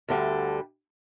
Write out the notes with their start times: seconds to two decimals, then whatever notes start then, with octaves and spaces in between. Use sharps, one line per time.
0.09 D2 D3 G3